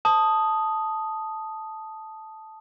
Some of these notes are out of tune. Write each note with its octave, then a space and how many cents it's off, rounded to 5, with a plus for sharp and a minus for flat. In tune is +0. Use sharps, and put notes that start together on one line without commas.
A5 -5 D#6 +0